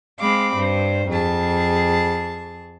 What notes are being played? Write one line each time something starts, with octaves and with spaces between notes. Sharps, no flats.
G#3 C4 F5 B5 D6
G2 C5
F2 G#4 A5